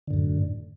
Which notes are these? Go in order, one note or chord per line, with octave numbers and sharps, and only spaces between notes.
F#2 A2 D3